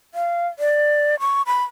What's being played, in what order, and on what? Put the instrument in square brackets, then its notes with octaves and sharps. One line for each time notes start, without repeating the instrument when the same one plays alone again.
[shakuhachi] F5
D5
C#6
B5